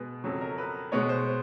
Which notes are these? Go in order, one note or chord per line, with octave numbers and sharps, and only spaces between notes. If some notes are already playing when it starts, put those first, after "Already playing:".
Already playing: B2 G#3 B3 G#4
F2 C#3 F#3 A4
A#4
B4
B2 G#3 B3 C#5
C5